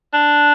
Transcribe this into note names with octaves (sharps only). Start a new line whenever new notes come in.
D4